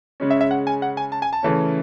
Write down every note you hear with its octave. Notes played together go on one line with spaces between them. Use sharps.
C#3 G#3 C#4
E5
E5
F#5
G#5
F#5
G#5
A5
G#5
A5
C#3 E3 A3 C#4